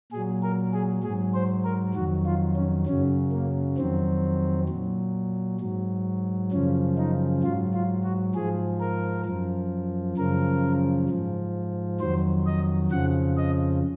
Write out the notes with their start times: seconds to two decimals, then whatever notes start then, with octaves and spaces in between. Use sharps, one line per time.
0.12 A#2 F#3 G#4
0.43 A#4
0.73 G#4
1.04 G#2 F#3 G#4
1.34 C5
1.64 A#4
1.94 F2 D#3 F#3 F#4
2.25 F4
2.56 C#4
2.86 F#2 C#3 F#3 C#4
3.32 A#3
3.78 F2 D#3 F#3 C4
4.69 A#2 F#3
5.60 G#2 F#3
6.52 F#2 C#3 F3 C#4
6.98 D#4
7.43 G#2 F#3 F4
7.73 F4
8.04 F#4
8.35 G#2 F3 G#4
8.80 A#4
9.26 F#2 F3
10.17 F#2 C#3 F3 A#4
11.09 G#2 F3
12.00 F2 D#3 F#3 C5
12.46 D#5
12.91 F2 C#3 F3 F#5
13.37 D#5